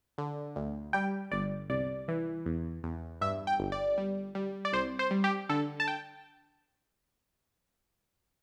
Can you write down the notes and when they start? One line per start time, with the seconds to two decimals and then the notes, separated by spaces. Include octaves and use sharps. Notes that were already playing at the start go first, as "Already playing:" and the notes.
0.18 D3
0.56 D2
0.93 G3 G5
1.31 G1 D5
1.70 C2 D5
2.08 E3
2.46 E2
2.83 E2
3.21 G2 E5
3.47 G5
3.59 G1
3.72 D5
3.98 G3
4.35 G3
4.65 D5
4.73 C2 C5
4.99 C5
5.11 G3
5.24 G4
5.49 D3 A4
5.80 A5
5.88 G5